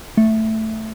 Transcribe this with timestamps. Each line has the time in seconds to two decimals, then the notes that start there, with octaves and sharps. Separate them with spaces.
0.17 A3